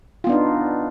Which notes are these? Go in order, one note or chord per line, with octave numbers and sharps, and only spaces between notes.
B3 D4 D#4 F4